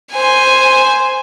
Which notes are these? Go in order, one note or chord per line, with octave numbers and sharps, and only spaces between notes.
C5 G#5